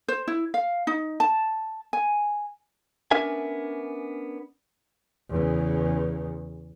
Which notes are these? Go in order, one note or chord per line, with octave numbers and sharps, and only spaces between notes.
C5
E4
F5
D#4
A5
G#5
B3 C#4 D4 A#4 E5 G#5
E2 C#3